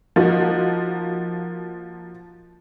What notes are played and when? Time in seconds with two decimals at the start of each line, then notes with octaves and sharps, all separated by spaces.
0.16 F3 A#3 D#4 F#4